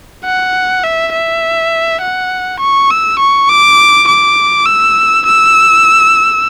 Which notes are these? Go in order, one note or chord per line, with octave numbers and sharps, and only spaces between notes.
F#5
E5
E5
F#5
C#6
E6
C#6
D6
D6
E6
E6